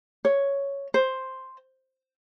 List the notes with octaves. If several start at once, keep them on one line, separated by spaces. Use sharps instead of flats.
C#5
C5